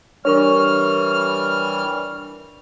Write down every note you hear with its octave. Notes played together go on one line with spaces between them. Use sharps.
E3 G3 D4 A#4 C#5 C#6 F6